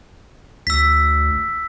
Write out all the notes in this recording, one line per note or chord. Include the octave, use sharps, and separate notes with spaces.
D2 E6 B6